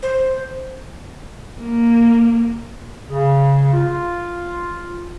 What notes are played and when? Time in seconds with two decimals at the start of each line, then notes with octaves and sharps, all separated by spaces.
0.02 C5
1.59 A#3
3.09 C#3
3.73 F4